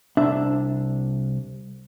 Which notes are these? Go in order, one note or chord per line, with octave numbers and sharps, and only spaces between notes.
C2 D4 E5